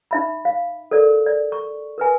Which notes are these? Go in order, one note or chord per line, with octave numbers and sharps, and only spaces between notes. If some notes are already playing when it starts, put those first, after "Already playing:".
D#4 E5 B5
F5
A4 A#4 D5
D5
C#6
A#4 B4 G#5